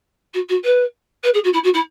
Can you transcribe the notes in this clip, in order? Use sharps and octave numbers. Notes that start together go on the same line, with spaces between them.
F#4
F#4
B4
B4
G#4
F#4
E4
F#4
E4